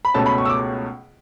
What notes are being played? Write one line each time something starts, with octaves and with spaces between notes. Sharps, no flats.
B5
C#2 B2 A3 C#4 A5
B5
C#6
E6
D6